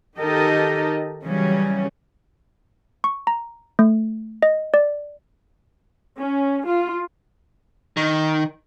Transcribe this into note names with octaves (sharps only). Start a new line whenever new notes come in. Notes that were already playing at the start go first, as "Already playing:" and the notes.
D#3 D#4 G4 A4 A#4 D#5
C#3 E3 F#3 G3 C#4
C#6
A#5
A3
D#5
D5
C#4
F4
D#3